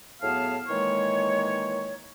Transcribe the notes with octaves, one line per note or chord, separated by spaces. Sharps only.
A2 F#3 B3 G#4 F5 A5
D#3 E3 G#3 A#3 C#5